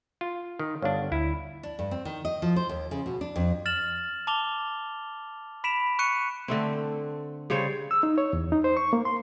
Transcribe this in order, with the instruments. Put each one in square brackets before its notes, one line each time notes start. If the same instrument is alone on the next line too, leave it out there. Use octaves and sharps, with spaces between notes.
[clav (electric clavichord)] F4
D#3
[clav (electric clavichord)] G1 D4 [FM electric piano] C#5 F5
[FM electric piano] D2 [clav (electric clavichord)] E4
[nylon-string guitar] D4
G2
C4
D#3
D#5
F3
C5
D#2
C#3
B2
D4
F2
[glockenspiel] F6 A6 E7 F#7
A5 D6 F7 G7
B5 B6 D7 E7 F7
C#6 F#6 C#7 D#7
[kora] D3 A3 C4
C#3 G3 C5 C#5
[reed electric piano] E6
D#4
C#5
E2
D#4
C5
C#6
A#3
C6